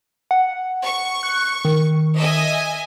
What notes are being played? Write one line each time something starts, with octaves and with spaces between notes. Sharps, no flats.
F#5
C#6
F#6
D#3
D#5 E5 G#5